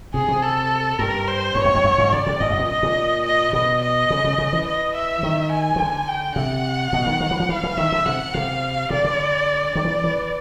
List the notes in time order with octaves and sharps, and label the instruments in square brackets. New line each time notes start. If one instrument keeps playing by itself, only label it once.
[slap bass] C3 [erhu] G#4
[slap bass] C3
[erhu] A4
[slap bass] G2 [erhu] A#4
[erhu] C5
[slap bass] G2 [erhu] C#5
[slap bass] F#2
F2
F#2
G#2
[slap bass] C#3 [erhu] D5
[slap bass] C3
[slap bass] G#2 [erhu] D#5
[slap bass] F#2
A#2
[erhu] D#5
[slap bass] A#2
[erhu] D#5
[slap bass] B2 [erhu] D#5
[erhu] D#5
[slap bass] C#3
C#3
C#3
E3
[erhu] D#5
E5
[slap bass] D#3
[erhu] G#5
[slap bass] D#3
D3
[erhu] G5
[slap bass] C3 [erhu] F#5
[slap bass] B2
D#3
D#3
E3
F3
[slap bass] E3 [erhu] F5
[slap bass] E3
[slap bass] D#3 [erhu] E5
[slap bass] D3
[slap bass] C3 [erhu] F#5
[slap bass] C3 [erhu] F5
[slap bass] C3 [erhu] D5
[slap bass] D3
[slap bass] D#3 [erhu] D5
[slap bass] E3
E3